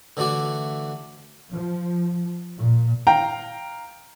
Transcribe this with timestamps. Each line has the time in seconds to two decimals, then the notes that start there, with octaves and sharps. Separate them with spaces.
0.17 D3 E3 A3 F#4 D5
1.51 F3
2.58 A#2
3.07 F5 G5 A#5